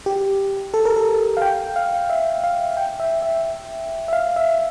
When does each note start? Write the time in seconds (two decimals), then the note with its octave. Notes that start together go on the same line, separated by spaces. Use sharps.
0.06 G4
0.74 A4
0.85 A#4
0.96 A4
1.37 F5
1.42 G5
1.76 F5
2.10 E5
2.44 F5
2.77 G5
3.00 E5
3.22 E5
4.08 E5
4.13 F5
4.36 E5